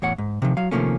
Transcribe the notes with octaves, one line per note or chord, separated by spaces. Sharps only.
E2 A2 C#5 F#5
G#2
C3 D#3 F3
F#3 F5
C3 D#3 F3 A3 A#3 C#4